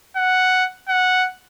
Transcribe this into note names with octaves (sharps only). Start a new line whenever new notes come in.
F#5
F#5